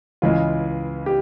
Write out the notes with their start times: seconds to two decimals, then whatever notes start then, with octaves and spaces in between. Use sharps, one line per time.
0.22 C#2 C#3 E3 G#3 F4
1.06 G4